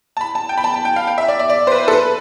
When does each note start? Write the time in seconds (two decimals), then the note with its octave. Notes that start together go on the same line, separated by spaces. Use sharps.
0.17 A5
0.21 B5
0.35 A5
0.49 G5
0.57 B5
0.64 A5
0.74 A5
0.85 G5
0.96 F5
1.07 G5
1.18 E5
1.28 D5
1.39 D5
1.50 D5
1.67 C5
1.72 B4
1.88 A4
1.93 B4